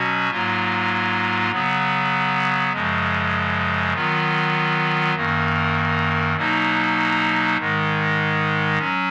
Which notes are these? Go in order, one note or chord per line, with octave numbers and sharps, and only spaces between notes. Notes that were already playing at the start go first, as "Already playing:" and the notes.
Already playing: B2 F#3 C#4 F#4
G#2 F#3 A#3 F4
C#3 F#3 B3
F#2 C#3 F3 G#3
D#3 F#3 B3 F4
F#2 D#3 A#3
B2 F#3 A#3 D#4
G#2 D#3 G#3
F#3 C#4